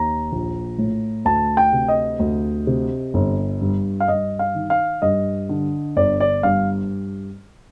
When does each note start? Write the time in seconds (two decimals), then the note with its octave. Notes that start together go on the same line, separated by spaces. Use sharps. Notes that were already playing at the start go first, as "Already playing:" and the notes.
Already playing: D#2 A#5
0.32 A#1
0.78 A2
1.25 D2 A5
1.57 G5
1.73 C3
1.88 D#5
2.19 D2
2.67 C3
3.14 G1
3.61 G2
4.00 F5
4.08 G2 D#5
4.39 F5
4.55 D#3
4.70 F5
5.02 G2 D#5
5.49 D3
5.97 G1 D5
6.20 D5
6.43 G2 F5